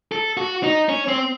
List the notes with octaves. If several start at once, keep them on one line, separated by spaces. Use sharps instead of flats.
A4
F#4
D#4
C#4
C4